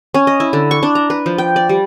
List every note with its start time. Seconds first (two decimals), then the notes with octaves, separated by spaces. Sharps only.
0.14 C#4
0.27 D#5
0.40 E4
0.53 D3
0.71 C#6
0.83 D4
0.95 A#5
1.10 B4
1.26 F3
1.38 G5
1.56 D5
1.69 G3